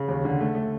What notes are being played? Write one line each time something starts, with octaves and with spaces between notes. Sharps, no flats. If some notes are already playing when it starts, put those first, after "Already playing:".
Already playing: C#3
D#2
D3
A3
A3